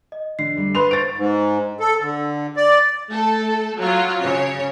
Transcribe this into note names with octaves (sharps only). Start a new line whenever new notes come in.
D#5
D3 C7
F2 G3 A3
B4 F#5 C6 F7
C5 C#6 A6 D7
G#2
A4
D3
D5
A3 A4
F#3 F4
C#3 C#5